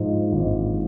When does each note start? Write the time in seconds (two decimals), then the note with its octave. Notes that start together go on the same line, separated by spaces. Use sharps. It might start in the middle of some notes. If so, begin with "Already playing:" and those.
Already playing: G#2 F3
0.33 G#1